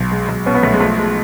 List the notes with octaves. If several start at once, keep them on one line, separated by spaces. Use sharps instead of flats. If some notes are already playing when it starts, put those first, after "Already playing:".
Already playing: B1
G#3
B1
B2 C#4
B3
B1 A3
G#3
F3 A3
G#3